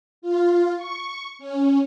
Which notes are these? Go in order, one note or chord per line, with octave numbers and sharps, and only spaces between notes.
F4
C#6
C#4